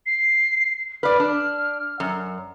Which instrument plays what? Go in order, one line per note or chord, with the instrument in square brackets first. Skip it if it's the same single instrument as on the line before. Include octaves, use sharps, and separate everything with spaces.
[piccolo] C7
[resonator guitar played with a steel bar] B4 D5 [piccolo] F6
[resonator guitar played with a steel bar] D4
F#2